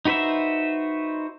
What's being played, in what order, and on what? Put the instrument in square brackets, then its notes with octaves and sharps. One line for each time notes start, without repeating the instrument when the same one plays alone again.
[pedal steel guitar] D#4 F#4 B4 C5 E5